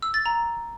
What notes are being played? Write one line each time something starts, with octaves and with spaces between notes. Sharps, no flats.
E6
A6
A#5